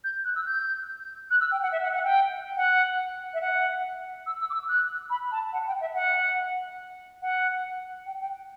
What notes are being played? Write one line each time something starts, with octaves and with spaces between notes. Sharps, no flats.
G6
F#6
E6
G6
F#6
E6
G5
F#5
E5
F#5
F#5
G5
F#5
E5
F#5
E6
E6
D6
E6
F#6
B5
A5
F#5
G5
E5
F#5
F#5
G5
G5